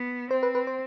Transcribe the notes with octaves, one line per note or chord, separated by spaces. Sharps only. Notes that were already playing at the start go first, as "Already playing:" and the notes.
Already playing: B3
C4 C5
B4
B4
C5